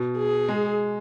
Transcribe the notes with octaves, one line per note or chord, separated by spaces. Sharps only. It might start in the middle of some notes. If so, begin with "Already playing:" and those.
Already playing: B2
G#4
G#3